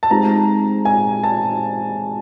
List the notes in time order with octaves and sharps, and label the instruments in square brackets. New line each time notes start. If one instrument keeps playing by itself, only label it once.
[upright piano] A5
[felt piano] G#3 C4 D#4 G4 [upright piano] A#5
[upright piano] G#5
A5